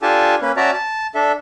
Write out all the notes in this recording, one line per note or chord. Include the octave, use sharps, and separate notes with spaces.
D4 F4 G4 A4 G#5 A5
A#3 C#4 B4
C#4 F#4 D5 E5 A5 A#5
A5
D4 A4 E5